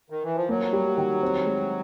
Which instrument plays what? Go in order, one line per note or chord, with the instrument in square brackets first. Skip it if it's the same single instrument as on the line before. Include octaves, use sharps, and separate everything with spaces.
[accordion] D#3
E3
F3
[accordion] F#3 [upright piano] A#3
[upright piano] G3
D#3
C4
G#3